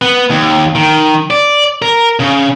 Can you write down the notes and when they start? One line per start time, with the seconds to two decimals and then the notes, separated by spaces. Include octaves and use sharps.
0.02 B3
0.30 D#2
0.75 D#3
1.31 D5
1.82 A#4
2.20 C#3